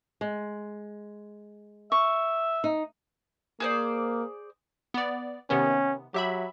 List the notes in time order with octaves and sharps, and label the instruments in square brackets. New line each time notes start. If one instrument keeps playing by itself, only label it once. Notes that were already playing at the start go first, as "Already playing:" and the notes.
[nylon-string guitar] G#3
[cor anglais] E5 [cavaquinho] C#6
[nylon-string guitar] D#4
[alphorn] A#3 [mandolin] G#4 C5 D5
[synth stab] B3 D5
[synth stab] C3 D#3 B3 [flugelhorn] C#4
[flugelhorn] F#3 [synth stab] G4 E5 B5